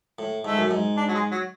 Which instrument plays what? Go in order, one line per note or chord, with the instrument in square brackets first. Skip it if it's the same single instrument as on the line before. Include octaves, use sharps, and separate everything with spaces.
[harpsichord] A2
[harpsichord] G#2 [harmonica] A3
[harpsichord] F#2
G#2
[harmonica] D4
F#3
G#3
F#3